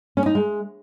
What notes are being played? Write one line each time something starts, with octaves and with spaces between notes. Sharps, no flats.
C#4
D#4
G#3